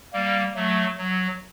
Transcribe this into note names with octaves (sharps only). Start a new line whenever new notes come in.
G3 A#3
F#3 A3
F#3